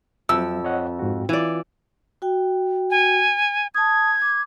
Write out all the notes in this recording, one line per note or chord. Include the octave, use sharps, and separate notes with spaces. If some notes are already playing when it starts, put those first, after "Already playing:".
F2 F#3 C4 E5 E6
C#5 D#5 F#5
G#2 F#4
E3 F4 D5
F#4 G5
G#5
A5 D#6 G#6
D6